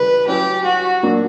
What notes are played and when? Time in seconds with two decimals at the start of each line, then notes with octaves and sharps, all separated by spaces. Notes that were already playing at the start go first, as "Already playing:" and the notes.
Already playing: C#3 E3 G3 B4
0.27 F#3 C#4 E4 G4
0.65 F#4
1.03 A#2 F#3 A#3 D4